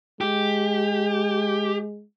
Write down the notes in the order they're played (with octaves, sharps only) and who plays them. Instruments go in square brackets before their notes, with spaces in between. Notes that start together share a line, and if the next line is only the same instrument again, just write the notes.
[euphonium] G#3 [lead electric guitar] G4